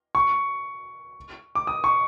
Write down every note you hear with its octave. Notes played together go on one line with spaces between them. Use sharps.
C#6
D6
D#6
C#6